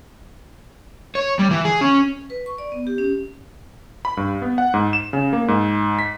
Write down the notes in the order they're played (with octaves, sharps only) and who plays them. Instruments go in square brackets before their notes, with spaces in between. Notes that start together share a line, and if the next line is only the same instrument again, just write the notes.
[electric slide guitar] C#5
G3
E3
G#4
C#4
[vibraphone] B4
C#6
D5
B3
G4
C#4
[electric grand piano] B5
G2
B3
F#5
G#2
E7
C#3
A#3
G#2
B6